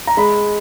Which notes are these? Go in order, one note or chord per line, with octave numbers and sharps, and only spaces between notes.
A#5
G#3 B5